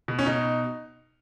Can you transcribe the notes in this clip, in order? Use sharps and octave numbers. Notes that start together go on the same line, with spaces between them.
B2
C#4
B2 D#4